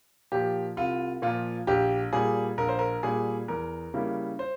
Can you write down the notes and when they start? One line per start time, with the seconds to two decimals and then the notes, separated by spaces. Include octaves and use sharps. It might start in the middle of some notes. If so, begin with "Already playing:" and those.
0.32 A#2 F3 G4
0.77 C2 F4
1.22 A#2 F3 F4
1.67 A#1 G4
2.13 A#2 G3 G#4
2.58 A#1 A#4
2.69 C5
2.79 A#4
3.03 A#2 G3 G#4
3.48 E2 A#4
3.94 C#3 G3 A#3 E4
4.39 C5